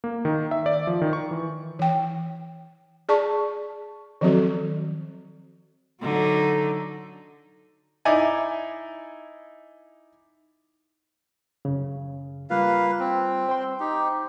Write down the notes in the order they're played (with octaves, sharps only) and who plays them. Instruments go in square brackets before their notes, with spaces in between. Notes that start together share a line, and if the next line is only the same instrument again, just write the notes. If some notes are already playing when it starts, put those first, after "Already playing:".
[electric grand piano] A#3
D#3
E5
D5
F3
D#3
C#6
E3
[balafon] E3 G5
G#4 D5 A5 C#6
D#3 F3 F#3 C4 F#4 A4
[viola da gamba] D3 F#3 D#4
[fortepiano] D#4 E4 D5 G#5
[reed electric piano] F#2 C#3
[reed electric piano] G3 F4 [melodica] A#3 B4 F5
[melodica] C4
[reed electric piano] C5 G5 C6
[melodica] D#4 G4